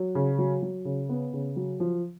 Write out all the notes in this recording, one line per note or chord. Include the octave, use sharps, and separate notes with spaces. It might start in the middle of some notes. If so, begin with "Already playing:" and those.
Already playing: F#3
C#3
F#3
F#3
C#3
B3
C#3
F#3
F3